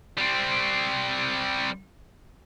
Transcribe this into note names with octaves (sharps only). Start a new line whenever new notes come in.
G3 C4